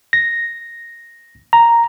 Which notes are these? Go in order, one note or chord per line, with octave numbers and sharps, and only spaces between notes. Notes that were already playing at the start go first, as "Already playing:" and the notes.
A#6
A#5